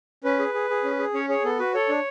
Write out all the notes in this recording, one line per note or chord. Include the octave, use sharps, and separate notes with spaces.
C#4 B4
G#4
G#4
G#4
C#4
G#4
C#4 C#5
G#4 C#5
B3 A4
F#4 B4
A4 C#5
D4